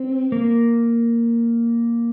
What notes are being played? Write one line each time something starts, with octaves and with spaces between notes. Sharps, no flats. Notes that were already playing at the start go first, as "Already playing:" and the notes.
Already playing: C4
A#3